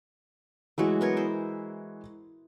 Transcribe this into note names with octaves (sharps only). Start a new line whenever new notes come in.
E3 F#3 G#3 A3 E4 F#4
B3 A#4 C#5
E4 C5